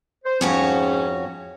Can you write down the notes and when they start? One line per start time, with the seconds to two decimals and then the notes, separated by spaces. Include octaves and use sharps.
0.25 C5
0.41 F2 G#2 C#4 F#4 C#5